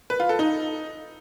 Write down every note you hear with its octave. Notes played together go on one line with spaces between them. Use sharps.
B4
F4
A4
D#4